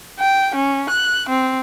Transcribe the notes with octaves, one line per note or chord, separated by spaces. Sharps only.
G5
C#4
F#6
C4